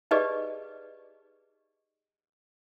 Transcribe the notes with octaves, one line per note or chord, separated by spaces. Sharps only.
D#4 G4 G#4 B4 D5 D#5